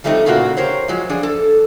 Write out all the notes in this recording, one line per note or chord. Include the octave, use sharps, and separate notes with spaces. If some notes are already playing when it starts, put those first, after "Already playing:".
F3 G3 A3 C4 D#4
A#2 C#3 A#3 F4 F#4
G4 A#4 C5 C#5
F3 F#3 G#3
F3 D4 G#4
A4